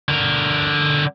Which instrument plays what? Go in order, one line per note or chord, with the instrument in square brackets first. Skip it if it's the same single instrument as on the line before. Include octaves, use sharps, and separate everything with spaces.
[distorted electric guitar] D3 A#4